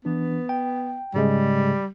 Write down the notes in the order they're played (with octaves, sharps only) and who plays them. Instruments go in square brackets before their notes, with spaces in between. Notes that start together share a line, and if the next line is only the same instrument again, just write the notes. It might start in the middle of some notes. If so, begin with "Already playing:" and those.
[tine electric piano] E3 D4 [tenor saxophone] B3
[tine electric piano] G5
[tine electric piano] G#2 C#3 G#3 [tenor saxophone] G3